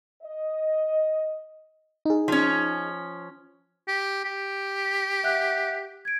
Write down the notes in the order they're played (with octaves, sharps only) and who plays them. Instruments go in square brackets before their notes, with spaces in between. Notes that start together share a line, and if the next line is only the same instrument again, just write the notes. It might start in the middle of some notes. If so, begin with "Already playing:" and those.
[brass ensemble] D#5
[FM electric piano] D#4 G#4
[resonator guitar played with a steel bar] F3 C#4
[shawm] G4
G4
[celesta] E5 F#5 F#6
G#6 D7